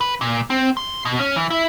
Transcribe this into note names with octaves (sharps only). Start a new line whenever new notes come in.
B4
A#2
C4
C6
B2
C#4
E3
E4